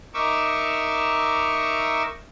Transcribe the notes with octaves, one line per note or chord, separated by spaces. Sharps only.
D#4 A#4 E5 C#6 D6 E6